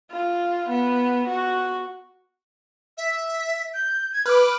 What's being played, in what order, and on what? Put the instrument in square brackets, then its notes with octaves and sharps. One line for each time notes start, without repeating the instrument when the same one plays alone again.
[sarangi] F4
B3
F#4
[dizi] E5
G6
G#6
[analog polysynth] B4 D6 [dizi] F6